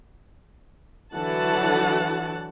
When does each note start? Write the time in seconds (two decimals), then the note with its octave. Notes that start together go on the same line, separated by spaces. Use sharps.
1.15 D3 E3 F#3 F#4 F#5 A5